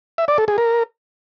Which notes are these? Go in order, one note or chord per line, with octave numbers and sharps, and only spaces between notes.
E5
D5
A4
G#4
A#4